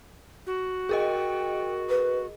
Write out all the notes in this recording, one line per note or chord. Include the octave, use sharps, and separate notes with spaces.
F#4
G#4 A#4 D#5 G5
B4